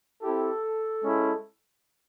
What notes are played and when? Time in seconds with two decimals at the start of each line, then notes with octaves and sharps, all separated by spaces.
0.22 C4 E4 G4 A4
1.04 G#3 C#4 E4